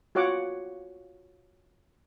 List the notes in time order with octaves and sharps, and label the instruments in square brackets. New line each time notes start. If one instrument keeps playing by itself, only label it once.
[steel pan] F4 F#4 C#5 F#5 D6